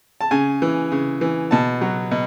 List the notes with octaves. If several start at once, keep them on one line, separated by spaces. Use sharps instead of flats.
A5
C#3 G#5
E3
C#3
E3
B2 A5
F#3
B2